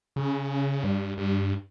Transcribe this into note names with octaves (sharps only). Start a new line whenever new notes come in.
C#3
G2
G2